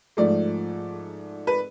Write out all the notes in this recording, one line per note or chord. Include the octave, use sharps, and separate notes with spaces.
G#2 F3 A3 D5
B4